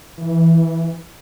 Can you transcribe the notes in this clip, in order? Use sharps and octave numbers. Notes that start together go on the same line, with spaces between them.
E3